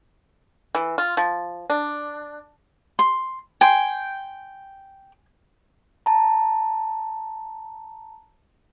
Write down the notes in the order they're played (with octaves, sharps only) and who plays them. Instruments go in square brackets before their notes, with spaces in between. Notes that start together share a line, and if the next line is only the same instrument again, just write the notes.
[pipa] E3
F4
F3
D4
[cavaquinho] C6
[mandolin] G5 [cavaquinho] G#5 C6
[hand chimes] A5 A#5